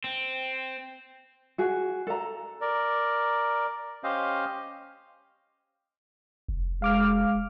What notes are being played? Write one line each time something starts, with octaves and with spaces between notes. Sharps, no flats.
C4
F#4 G#4
A4 A#5
A#4 D5
C#4 G4 C5 D#5 F5
F1
G#3 F5 D6 F6